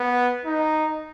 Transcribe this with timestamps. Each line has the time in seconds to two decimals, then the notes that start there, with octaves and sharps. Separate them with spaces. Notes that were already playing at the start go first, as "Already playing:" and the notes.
Already playing: B3
0.45 D#4